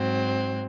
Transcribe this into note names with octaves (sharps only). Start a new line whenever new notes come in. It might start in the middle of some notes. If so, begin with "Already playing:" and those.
Already playing: G#2 F#3 C4